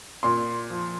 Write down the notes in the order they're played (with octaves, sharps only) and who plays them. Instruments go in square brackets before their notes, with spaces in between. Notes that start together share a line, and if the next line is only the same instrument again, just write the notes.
[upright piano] A#2 C6
F3